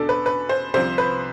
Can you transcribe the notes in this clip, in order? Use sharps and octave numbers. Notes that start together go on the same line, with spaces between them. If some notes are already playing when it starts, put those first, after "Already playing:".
Already playing: E2 B2 D4 A4
B4
B4
C5
C2 C3 F3 C5
B4